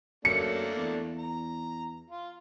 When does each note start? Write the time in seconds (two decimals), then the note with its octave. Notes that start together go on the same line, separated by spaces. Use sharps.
0.25 F#2 A3 A#3 D4 C#7
0.77 E2
1.18 A#5
2.11 F4